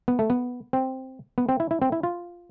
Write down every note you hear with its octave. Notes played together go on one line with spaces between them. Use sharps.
B3
A3
B3
C4
B3
C4
E4
E4
C4
E4
F4